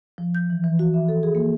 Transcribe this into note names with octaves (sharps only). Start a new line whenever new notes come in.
F3
G6
E3
E3
F#4
E5
A4
G#4
A#3